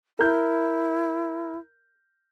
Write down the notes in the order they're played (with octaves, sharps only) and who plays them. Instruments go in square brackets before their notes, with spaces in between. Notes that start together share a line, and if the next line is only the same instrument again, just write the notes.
[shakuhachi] E4 [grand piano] A#4 G6